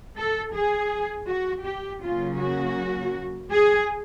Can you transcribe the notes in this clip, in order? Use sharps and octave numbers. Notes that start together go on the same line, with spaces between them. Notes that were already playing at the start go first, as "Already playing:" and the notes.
A4
G#4
F#4
G4
C#3 F#3 A#3 C#4 F4
F#4
G#4